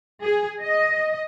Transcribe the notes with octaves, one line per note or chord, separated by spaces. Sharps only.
G#4
D#5